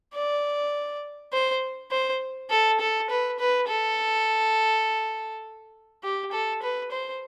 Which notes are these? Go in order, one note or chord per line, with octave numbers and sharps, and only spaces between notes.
D5
C5
C5
A4
A4
B4
B4
A4
G4
A4
B4
C5